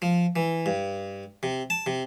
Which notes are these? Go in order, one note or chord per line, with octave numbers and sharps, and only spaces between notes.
F3
E3
G2
C3
A5
C3